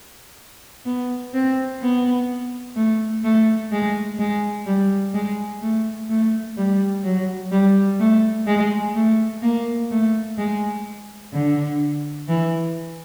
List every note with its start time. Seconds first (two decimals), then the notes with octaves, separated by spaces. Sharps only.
0.86 B3
1.34 C4
1.82 B3
2.76 A3
3.24 A3
3.72 G#3
4.19 G#3
4.66 G3
5.14 G#3
5.62 A3
6.10 A3
6.57 G3
7.04 F#3
7.52 G3
8.00 A3
8.47 G#3
8.95 A3
9.43 A#3
9.91 A3
10.38 G#3
11.33 D3
12.29 E3